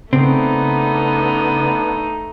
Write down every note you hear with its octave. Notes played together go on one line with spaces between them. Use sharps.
C#3 A3 B3 C4 D4 D#4